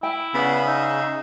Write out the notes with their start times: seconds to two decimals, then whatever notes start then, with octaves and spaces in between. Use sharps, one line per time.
0.03 E4 G5
0.34 C#3 B3 D5 F#5 B5
0.67 D#4 E5